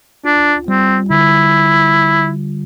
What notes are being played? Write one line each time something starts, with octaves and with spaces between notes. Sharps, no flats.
D4 F4
G3 C4
D3 E4